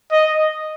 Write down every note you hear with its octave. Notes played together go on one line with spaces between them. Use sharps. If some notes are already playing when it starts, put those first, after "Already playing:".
D#5